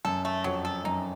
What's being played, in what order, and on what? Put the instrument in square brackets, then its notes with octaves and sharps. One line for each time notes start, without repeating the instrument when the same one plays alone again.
[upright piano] F#2 [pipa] A4
[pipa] A3
[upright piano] F2 [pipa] F#3
[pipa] A4
[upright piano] F#2 [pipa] D#4